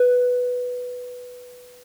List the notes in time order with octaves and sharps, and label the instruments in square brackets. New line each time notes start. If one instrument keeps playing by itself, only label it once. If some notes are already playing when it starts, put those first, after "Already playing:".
Already playing: [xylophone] B4